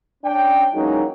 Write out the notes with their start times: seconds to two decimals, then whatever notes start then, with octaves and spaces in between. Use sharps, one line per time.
0.24 C#4 D4 G5
0.74 E3 F#3 G#3 A#3 C#4 D#4